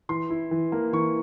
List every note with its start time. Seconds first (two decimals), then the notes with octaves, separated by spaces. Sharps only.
0.09 E3 C6
0.30 E4
0.51 E3
0.72 A#3
0.93 E3 C#6